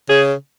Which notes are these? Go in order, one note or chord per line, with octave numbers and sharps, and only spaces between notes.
C#3 G#4